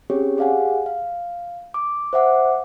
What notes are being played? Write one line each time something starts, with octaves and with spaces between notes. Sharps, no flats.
C4 C#4 G4 G#4 C#5
G4 G#4 D5 F5 F#5 G#5
F5
D6
C5 E5 F#5 D6